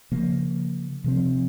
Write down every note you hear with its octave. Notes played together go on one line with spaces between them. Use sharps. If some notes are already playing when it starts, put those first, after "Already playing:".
C#3 F3 A#3
C3 F3 C4